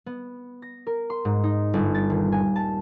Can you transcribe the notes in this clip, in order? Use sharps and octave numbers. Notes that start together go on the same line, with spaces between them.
B3
A#6
A#4
C6
G#2
D#4
G1
A6
D#1
G#5
A5